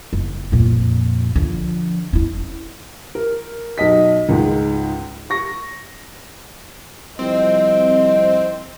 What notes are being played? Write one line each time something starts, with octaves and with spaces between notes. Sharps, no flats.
F#1
F2 A#2
D3 F3
C#4 E4
A#4
B1 D#5 B6
C#2 G#2
C#6 A#6
C2 F3 C4 D#5